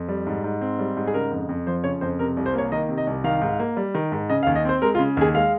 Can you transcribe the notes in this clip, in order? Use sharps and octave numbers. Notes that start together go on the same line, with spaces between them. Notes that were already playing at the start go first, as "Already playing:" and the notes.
Already playing: F2
G3
G#2
G#2
C4
G3
G#2
G#4
C#3 A#4
F2
F2
F3 C5
C#3 C#5
F2 C5
C3 A#4
C2
C5
A#3 C#5
D#3 D#5
C3
D#5
C2
D#3 F5
G#2
A#3
G3
D#3
G#2
C#3 D#5
F5
D#2
D#5
C4 C5
G#3 A#4
F4
C#3
D#2 G#4
G#3 F5